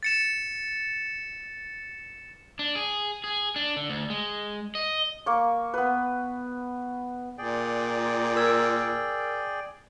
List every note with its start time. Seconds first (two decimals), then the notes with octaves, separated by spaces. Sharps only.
0.03 A6 C#7 E7
2.59 D4
2.75 G#4
3.24 G#4
3.56 D4
3.76 D3
3.90 D2
4.10 G#3
4.75 D#5
5.26 A#3 C#6
5.74 B3 B4
7.38 A#2 G#4 D5 G5
8.36 A#4 E6 G#6